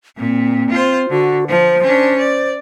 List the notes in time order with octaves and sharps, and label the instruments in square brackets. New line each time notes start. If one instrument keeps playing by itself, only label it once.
[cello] A#2 [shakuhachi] C4
[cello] F4 C5
[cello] D3 [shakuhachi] F#4
[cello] F3 [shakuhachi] C5
[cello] C#4 D4
D5